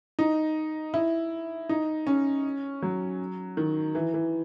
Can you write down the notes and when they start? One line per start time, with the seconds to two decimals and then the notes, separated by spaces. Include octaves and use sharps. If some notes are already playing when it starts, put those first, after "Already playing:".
0.19 D#4
0.94 E4
1.69 D#4
2.07 C#4
2.82 F#3
3.57 D#3
3.95 E3
4.14 E3